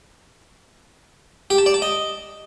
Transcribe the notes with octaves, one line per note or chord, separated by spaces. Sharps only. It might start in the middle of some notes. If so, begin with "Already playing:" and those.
G4
A5
D5
A5
D#5